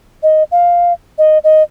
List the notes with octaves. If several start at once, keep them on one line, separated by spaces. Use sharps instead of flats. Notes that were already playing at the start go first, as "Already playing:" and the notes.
D#5
F5
D#5
D#5